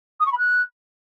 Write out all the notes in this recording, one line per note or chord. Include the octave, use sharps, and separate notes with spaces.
D#6
C#6
B5
F#6